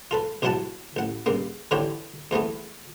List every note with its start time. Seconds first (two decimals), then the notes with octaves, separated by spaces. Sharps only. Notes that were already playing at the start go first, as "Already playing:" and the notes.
0.11 F4 A4 B4
0.42 A#1 B2 F#3 E4 F#5 A5
0.96 A1 F#5
1.26 G2 C#3 A#3
1.71 D3 E3 E4 F4 G4 C#5
2.31 E2 E3 A3 B3